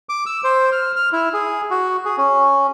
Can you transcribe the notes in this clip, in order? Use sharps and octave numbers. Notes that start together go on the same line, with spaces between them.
D6
E6
C5
F6
F6
E4
G#4
F#4
G#4
C#4